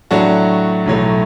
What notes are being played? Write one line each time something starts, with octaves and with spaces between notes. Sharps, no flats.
A2 F#3 A3 D4 F#4
B1 A2 F#3 A3